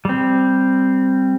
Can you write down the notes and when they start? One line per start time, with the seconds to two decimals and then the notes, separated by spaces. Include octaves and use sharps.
0.05 G3 C4